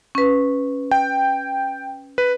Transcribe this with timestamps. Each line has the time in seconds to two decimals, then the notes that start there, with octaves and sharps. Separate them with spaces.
0.15 C#4 B4
0.91 G5
2.18 B4